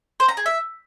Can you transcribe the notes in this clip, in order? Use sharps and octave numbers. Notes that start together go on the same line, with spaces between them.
C5
A#5
G#4
E5